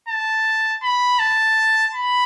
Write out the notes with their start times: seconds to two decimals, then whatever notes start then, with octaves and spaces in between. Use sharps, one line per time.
0.08 A5
0.83 B5
1.19 A5
1.93 B5